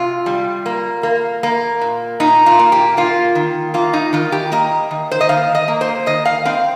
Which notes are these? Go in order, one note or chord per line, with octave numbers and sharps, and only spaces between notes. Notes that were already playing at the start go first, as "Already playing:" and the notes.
Already playing: C3 F4
G3
A#3
A#3
A#3
A#2
A#2 D#4
F4
A#3
G4
A#3 F4
D#3
A#3 F4
D#4
D#3 F4
G4
A#3 D#5
D#3
C5
D#5
D#3 F5
D#5
A#3
C5
D#3 D#5
F5
C4 F5